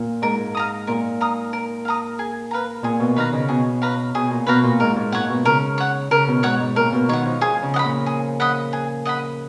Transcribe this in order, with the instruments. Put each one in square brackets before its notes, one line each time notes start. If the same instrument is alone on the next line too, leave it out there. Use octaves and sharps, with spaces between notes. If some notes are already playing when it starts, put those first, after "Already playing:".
Already playing: [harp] A#2
[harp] G#2 [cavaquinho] A#4
[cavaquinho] F5 A#5 D#6
[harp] A#2 [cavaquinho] A#4
[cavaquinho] F5 A#5 D#6
A#4
F5 A#5 D#6
G#4
B4 F5 A#5
[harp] A#2 [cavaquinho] G#4
[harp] B2
[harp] D#3 [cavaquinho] B4 F5 A#5
[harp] C#3
[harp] B2 [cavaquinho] G#4
[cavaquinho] B4 F5 A#5
[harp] B2 [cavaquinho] G#4
[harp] A#2
[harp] B2 [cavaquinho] B4 F5 A#5
[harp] A#2
[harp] G#2 [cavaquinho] A#4
[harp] G#2
[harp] A#2 [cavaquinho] C#5 F#5
[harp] B2
[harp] C#3 [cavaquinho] A#4
[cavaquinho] C#5 F#5
[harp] C#3 [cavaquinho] A#4
[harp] B2
[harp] G#2 [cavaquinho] C#5 F#5
[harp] G#2
[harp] A#2 [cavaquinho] A#4
[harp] B2
[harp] D#3 [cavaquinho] C#5 F#5
[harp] F3
[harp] F3 [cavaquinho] G#4
[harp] C#3
[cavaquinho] D#5 F#5
B5
[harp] A#2
[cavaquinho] G#4
D#5 F#5 B5
G#4
D#5 F#5 B5